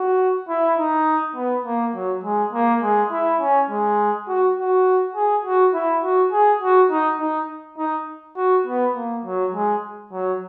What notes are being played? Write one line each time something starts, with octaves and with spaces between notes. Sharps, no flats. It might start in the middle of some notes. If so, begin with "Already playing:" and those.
Already playing: F#4
E4
D#4
B3
A#3
F#3
G#3
A#3
G#3
E4
C#4
G#3
F#4
F#4
G#4
F#4
E4
F#4
G#4
F#4
D#4
D#4
D#4
F#4
B3
A#3
F#3
G#3
F#3